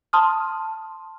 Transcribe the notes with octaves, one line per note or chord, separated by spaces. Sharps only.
A5 C6 D#6 F6